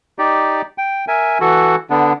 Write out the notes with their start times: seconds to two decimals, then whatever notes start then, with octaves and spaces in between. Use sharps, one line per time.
0.19 D#4 G4 D5
0.78 G5
1.08 A#4 E5 G#5
1.41 E3 F#4 A4
1.90 D3 B3 D4